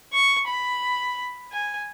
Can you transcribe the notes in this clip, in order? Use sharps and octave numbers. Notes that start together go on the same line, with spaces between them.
C#6
B5
G#5